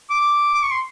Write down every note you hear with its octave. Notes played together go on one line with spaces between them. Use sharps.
D6
D6
C#6
C6